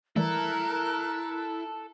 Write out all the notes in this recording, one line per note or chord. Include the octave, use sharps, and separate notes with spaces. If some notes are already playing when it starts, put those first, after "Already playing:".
E3 G3 A3 E4 A4 A#4 F#6